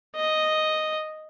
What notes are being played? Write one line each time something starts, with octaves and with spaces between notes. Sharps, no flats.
D#5